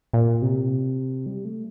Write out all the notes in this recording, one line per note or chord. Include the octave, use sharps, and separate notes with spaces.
A#2
C3
G3
A3